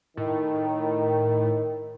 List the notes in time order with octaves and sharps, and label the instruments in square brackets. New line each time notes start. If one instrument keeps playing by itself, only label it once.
[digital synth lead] A2 [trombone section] D#3